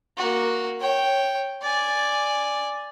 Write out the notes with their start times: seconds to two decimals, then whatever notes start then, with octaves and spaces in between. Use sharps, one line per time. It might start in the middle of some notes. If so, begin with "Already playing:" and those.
0.17 A#3 F#4
0.80 C#5 G5
1.62 D5 G#5